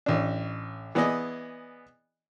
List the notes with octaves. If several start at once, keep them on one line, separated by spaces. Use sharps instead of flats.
A1 D4
E3 B3 G#4 D5 D#5